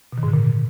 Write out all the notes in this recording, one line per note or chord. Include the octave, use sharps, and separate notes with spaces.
B2
D#3
G#2
D3
A#2